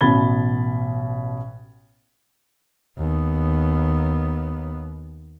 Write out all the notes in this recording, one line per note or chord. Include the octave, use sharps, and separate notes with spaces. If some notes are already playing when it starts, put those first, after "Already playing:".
A1 B2 B5 G#6 A6 G7
D#2 B3